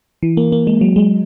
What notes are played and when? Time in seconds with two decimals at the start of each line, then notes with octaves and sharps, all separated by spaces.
0.23 E3
0.37 A#3
0.52 A#3
0.67 G#3
0.81 F#3
0.96 G#3